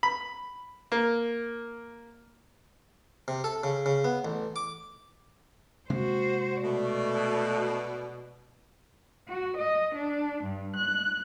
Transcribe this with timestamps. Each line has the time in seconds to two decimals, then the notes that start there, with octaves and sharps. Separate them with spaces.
0.03 B5
0.92 A#3
3.28 C3
3.44 A4
3.64 C#3
3.86 C#3
4.04 B3
4.25 A1
4.56 D6
5.90 C3 G#3 A#3 F#4 C5
6.63 B2 A3 D5
9.28 F#4
9.58 D#5
9.96 D4
10.44 G2
10.76 F#6